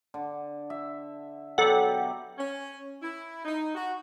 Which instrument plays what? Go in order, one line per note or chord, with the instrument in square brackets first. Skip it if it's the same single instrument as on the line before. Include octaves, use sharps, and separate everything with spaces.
[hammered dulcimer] D3
E5
[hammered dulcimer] B2 F#3 G4 [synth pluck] A4 F#5
[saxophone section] C#4
E4
D#4
F#4